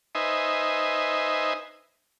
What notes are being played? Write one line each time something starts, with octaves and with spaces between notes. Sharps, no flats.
D#4 B4 C5 D#5 E5 G#5